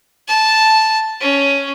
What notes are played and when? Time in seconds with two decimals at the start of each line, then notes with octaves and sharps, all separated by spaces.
0.28 A5
1.21 C#4